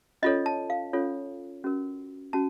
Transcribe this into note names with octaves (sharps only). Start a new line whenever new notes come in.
C#4 F4 A4 C#5 D#5
A5
F5
C#4 F4 A4 C#5
C#4 F#4 A#4
C#4 F#4 A5